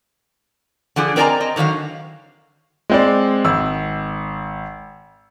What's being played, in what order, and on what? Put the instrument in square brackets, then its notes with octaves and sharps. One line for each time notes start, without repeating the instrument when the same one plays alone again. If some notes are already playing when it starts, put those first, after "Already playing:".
[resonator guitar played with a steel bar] D3 F3 D4 G#4
C4 A#4 D5 D#5 G#5 A#5
C4 D#5
D3 D#3 F#3 E5 F5
[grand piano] G#3 C4 D5
G#1 E6